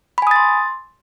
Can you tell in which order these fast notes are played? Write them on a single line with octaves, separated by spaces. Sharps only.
B5 G#5 D#6 A6 C6